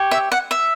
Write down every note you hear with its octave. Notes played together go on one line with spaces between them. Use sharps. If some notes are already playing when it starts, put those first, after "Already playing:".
Already playing: G4 C#5
E5
F#5
E5